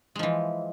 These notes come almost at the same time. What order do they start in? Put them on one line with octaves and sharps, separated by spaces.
G#3 F3 E3